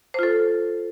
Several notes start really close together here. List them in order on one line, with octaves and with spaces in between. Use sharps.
C5 F4 A4